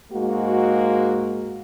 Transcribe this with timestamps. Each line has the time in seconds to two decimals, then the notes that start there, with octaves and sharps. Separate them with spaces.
0.12 G#2 G#3 A#3 F#4